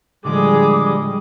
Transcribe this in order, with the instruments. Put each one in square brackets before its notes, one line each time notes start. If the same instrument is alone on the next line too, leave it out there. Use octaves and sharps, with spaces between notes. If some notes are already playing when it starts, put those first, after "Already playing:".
[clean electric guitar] A2 D3 F3 [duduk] G3 [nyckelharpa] G#3 G#4 [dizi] D6